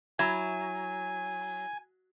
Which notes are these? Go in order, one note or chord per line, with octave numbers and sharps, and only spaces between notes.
F#3 E4 G#5 G#6